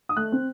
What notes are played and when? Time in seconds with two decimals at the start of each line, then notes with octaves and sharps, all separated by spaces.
0.09 D#6
0.17 A3 F#6
0.32 C4